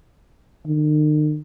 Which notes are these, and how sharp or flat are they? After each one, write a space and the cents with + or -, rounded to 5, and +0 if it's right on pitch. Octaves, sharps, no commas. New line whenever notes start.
D#3 -45